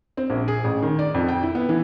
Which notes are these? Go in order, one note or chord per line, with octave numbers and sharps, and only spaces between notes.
C4
A#1
G#4
A1
D#3
D5
F2
G5
E4
B3
E3